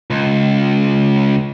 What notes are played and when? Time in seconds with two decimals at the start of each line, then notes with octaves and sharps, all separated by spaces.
0.10 C#2